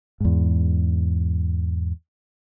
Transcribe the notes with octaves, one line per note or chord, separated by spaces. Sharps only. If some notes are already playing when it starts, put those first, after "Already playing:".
E2 G#2